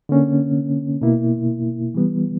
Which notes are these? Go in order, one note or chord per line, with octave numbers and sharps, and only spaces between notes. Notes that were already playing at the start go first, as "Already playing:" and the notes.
D3 A#3 C#4
B2 A#3 E4
E3 G3 B3